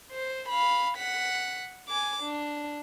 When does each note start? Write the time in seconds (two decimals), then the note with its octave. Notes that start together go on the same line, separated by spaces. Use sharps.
0.12 C5
0.49 F5 B5
0.97 F#5 B6
1.89 G#5 D6
2.23 D4